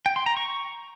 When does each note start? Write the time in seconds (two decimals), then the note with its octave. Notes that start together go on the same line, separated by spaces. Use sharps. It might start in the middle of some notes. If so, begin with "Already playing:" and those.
0.06 G5
0.16 C6
0.26 A#5
0.37 C#6